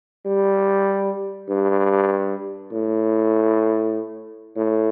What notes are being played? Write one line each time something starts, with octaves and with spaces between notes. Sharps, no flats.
G3
G2
A2
A2